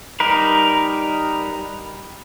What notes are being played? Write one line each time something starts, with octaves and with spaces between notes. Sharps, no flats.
G3 D#4 A#4 B4